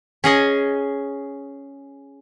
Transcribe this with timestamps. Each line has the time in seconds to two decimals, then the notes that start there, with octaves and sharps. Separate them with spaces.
0.24 C#4 G#4 D#5